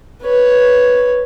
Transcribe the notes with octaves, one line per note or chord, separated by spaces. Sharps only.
B4 C#5